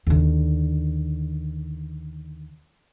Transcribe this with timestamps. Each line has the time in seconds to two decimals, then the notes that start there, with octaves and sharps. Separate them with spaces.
0.07 D#2 D3